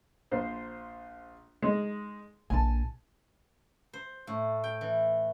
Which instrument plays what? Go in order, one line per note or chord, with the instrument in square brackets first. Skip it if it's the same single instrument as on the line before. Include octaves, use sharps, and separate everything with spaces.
[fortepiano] A#1 C5
G#3 D#4
[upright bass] A#1 E4 [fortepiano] G#5 A5
[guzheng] C5
A2
G5
E3